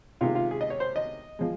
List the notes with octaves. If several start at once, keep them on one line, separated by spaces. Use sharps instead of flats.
C3 D#3 G#3 F4
F4
G#4
D#5
C#5
C5
D#5
F3 G#3